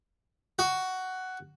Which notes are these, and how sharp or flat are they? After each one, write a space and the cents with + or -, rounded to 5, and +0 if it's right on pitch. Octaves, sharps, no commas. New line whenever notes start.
F#4 +10